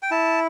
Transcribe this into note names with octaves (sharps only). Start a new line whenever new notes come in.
G5
E4 A5